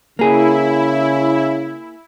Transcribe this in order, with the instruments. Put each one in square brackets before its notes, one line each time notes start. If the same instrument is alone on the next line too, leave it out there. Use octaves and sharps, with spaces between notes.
[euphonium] C#3 [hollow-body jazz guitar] A#3 G#4 [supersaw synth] E4